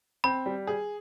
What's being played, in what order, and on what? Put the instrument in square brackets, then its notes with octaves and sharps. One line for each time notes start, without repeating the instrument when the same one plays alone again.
[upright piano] C4 [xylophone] B5
[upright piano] G3
G#4